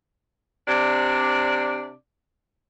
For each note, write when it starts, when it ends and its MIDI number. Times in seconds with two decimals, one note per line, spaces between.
0.66 1.93 48
0.66 1.93 62
0.66 1.93 74